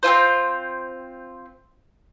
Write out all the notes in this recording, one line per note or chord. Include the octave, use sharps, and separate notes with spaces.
C4 C#4 F4 C5